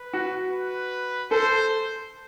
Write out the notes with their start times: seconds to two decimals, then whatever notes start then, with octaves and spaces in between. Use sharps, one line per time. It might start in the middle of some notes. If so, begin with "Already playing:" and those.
Already playing: B4
0.13 F#4
0.52 B4
1.31 A4 C5